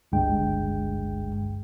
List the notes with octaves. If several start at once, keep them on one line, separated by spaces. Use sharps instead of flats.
G1 C#2 G2 G#3 G5